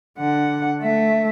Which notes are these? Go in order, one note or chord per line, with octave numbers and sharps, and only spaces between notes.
D3 F#5
A3 E5